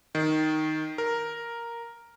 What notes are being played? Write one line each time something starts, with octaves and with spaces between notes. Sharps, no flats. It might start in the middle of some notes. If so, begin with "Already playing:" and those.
D#3
A#4